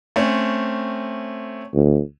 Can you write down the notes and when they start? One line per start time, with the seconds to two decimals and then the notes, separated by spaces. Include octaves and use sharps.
0.16 A3 C4 C#4
1.74 D2